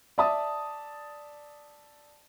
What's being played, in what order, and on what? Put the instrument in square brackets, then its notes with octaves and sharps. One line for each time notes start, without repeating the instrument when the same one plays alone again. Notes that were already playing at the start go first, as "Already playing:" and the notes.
[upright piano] D5 E5 A5 D#6